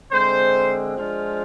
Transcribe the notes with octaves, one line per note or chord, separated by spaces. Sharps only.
D3 G#3 C4 C5
F3 G#3 D4 F4